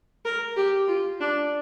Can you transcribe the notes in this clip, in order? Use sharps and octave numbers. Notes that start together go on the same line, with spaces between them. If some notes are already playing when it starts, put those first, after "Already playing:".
A#4
G4
F4
D4